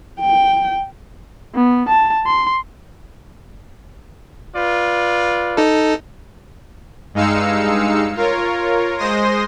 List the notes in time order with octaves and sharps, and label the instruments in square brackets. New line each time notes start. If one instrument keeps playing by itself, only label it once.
[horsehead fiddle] G5
[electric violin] B3
A5
C6
[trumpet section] F4 B4 D5
[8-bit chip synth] D#4 A4
[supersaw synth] G2 G#3 D#4 F5 E6 C#7
F4 A#4 C#5
G#3 C5 C6 D#6 A#6